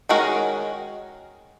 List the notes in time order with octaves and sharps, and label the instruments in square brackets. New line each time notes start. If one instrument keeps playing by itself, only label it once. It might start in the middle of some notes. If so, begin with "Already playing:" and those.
[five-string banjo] D#3 G#3 C#4 F#4 A#4